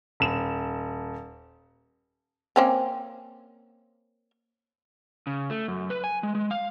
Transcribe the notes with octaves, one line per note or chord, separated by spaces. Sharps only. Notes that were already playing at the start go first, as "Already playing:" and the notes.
D#1 E7
A#3 C4 C#4
C#3
A3
F#2
B4
G#5
G#3
G#3
F5